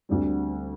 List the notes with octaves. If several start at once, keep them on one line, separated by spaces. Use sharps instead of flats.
D2 D3 G3 C4